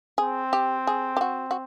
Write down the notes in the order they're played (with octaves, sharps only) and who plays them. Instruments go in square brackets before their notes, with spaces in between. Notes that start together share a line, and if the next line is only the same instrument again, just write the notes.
[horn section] C4 [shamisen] G#4
[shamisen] G4
G#4
G4
F#4
F#4